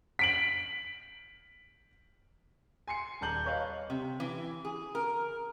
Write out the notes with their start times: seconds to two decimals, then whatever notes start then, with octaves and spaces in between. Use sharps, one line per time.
0.19 B6 D7 F#7
2.88 G#5 C6 C7 C#7
3.21 D#1 A5 A#5 G6 F#7
3.45 B4 C#5 D#5 F5
3.90 C3
4.20 E3
4.65 G#4
4.95 A#4